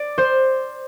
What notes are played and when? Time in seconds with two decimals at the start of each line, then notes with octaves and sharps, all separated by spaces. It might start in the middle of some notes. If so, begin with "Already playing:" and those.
Already playing: D5
0.18 C5